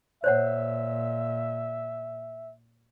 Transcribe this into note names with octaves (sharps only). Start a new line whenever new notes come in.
A#2 C5 C#5 E5 F#5